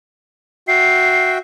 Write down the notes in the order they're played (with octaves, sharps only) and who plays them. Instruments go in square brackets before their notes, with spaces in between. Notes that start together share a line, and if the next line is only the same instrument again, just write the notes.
[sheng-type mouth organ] F#4 E5 G5 [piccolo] C7